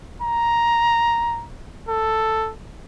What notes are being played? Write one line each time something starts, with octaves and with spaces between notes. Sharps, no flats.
A#5
A4